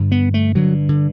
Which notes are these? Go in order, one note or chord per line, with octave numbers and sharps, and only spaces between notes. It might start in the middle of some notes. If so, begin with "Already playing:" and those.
Already playing: G2 D3
B3
A3
G2 D3 F#3
D3